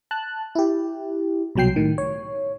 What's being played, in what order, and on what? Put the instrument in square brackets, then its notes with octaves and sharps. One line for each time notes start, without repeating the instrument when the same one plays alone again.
[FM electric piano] A5 F#6
E4 G4
C2 B2 F#3 G5 C7
A2 D#3
C#5